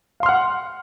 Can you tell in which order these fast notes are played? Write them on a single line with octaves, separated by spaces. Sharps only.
F5 C6 F6 F#5